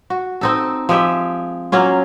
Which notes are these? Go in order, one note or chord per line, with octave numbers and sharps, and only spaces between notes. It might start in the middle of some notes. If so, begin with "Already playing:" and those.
F#4
C4 D#4 A4
F3 G#3 G4 E5
F#3 A#3 C#4 F4